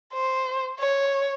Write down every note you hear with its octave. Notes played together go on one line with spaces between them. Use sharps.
C5
C#5